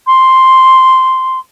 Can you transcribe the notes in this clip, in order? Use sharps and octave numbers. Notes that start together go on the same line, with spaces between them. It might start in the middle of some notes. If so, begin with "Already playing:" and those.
C6